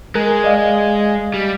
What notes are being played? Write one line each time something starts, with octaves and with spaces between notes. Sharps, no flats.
G#3 A#4 F#6
D5 D#5 F5
G3